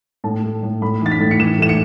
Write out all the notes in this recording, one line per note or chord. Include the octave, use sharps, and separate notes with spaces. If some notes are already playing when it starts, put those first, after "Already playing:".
A2 A5
A3
A2
A2 B5
E3 A6
B6
A2
C#7
E3 E7
A3 E7
C#7